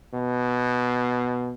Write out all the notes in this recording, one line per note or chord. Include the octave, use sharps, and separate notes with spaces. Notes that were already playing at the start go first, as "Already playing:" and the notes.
B2